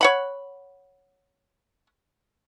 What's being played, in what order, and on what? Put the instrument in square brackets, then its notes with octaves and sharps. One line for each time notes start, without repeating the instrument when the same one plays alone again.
[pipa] C#5 F#5 B5